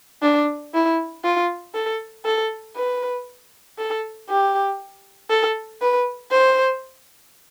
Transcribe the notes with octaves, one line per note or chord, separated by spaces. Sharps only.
D4
E4
F4
A4
A4
B4
A4
G4
A4
B4
C5